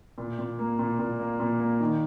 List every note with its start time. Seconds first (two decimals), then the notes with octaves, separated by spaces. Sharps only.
0.18 A#2
0.38 A#2
0.59 A#3
0.79 A#2
0.99 A#2
1.20 A#3
1.40 A#2
1.60 A#3
1.81 D#3